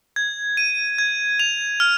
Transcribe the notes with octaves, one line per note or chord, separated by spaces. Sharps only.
G#6
D#7
G#6
F7
F6